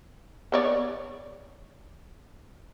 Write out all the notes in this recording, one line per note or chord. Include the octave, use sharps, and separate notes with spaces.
B3 C#5 D5